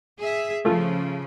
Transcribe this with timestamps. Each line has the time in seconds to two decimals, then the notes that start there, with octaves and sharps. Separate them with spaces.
0.18 G#4 E5
0.65 C#3 F3 A3 F4